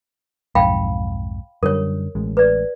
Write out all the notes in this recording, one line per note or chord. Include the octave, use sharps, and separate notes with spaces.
B1 F2 G#2 F5 G5 B5
F#2 D3 G3 A#4 C#5
A1 G#3
B4 D5